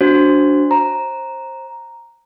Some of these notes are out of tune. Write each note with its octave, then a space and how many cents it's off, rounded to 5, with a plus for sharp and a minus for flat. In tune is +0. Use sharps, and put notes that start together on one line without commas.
D4 -15 F#4 +0 C5 +0
C5 +20 A#5 +0